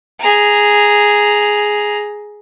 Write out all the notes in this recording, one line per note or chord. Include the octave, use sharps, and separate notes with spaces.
G#4 A#5